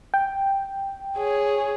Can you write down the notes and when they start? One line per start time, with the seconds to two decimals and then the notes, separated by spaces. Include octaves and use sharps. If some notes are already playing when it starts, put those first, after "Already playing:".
0.14 G5
1.18 G#4 C#5